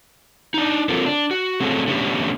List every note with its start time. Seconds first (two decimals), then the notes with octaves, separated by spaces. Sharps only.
0.54 D4 D#4
0.89 C4 F4 A4 A#4
1.06 D4
1.31 F#4
1.60 A3 C4 C#4 F#4 G#4 A4
1.87 D3 A3 B3 C#4 D4 G4